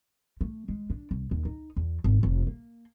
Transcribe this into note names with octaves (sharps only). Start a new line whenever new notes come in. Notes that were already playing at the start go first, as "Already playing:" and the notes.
A3
G#3
D4
C2
D#2
D#4
E2
G#1
F1
A#3